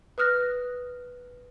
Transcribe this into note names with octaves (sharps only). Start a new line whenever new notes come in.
B4 D#6 F6 F#6 A#6